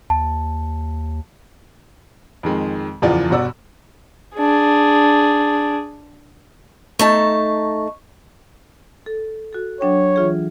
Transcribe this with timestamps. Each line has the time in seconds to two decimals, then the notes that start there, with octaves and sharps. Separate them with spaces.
0.10 D#2 A5
2.43 F2 D#3 G#3
3.02 F#1 E2 E3 F3 F4 D5
3.30 G1 B2 F#4 D5 E6
4.36 D4 G#4
6.99 A3 D#4 A5 C#6
9.06 A4
9.53 F#4 A4
9.81 F#3 D4 C#5 G5
10.16 E3 F4 G#4